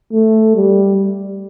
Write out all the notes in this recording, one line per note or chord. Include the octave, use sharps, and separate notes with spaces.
A3
G3